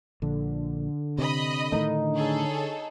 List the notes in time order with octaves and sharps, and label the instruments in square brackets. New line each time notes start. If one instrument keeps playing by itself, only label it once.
[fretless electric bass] A#1 [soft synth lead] D3
[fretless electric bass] C3 [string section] D#5 B5
[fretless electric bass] A2 D#3 A3 [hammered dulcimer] D#4
[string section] G#4 A4 C#5